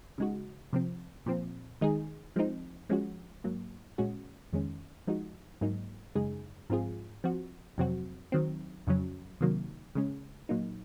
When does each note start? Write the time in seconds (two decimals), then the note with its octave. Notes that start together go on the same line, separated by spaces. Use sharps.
0.18 C#3 G#3 D#4 F#4
0.73 C3 F3 C4
1.26 A#2 F3 C4
1.81 D#3 G#3 D#4 G#4
2.36 F3 G#3 C4 D#4
2.89 F3 G#3 C#4 F#4
3.44 G#2 F#3 A#3
3.98 A#2 G#3 C#4 F#4
4.53 F2 D#3 G#3 C#4
5.07 F3 G#3 D#4 F#4
5.61 G#2 F#3 A#3 D#4
6.15 F#2 C#3 G#3 D#4 G#4
6.70 G#2 F3 C4 F4 G#4
7.24 F3 C4 F#4
7.78 F2 C3 F#3 C4 F#4
8.32 D#3 F#3 C4
8.87 F2 C#3 F#3 C#4
9.41 C3 D#3 F#3 A#3
9.95 C#3 G#3 C#4
10.49 A#2 F#3 A#3 D#4